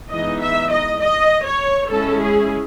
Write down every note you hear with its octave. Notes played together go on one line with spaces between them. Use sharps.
E3 G#3 B3 D#4 D#5
E5
D#5
D#5
C#5
G#3 C#4 E4 A4
G#4